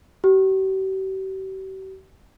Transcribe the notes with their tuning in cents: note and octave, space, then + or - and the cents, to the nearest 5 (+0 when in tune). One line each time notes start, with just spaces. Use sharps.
G4 -45